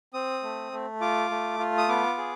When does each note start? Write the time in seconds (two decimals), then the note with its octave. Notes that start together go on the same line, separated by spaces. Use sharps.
0.14 C4 D#6
0.43 A3
0.72 A3
1.01 F4 D6
1.30 A3
1.59 F4
1.78 D#6
1.89 B3 D6
2.17 G#4